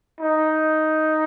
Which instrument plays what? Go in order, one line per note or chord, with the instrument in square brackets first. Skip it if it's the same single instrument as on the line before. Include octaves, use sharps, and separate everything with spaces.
[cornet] D#4